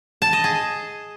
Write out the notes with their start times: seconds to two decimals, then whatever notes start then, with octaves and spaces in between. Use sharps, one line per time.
0.22 A5
0.33 D#5
0.44 G#4